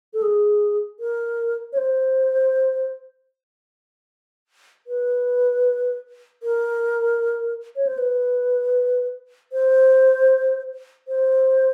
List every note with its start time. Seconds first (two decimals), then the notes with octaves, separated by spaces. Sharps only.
0.14 A4
0.22 G#4
1.00 A#4
1.73 C#5
1.77 C5
4.87 B4
6.43 A#4
7.76 C#5
7.87 C5
7.98 B4
9.52 C5
11.08 C5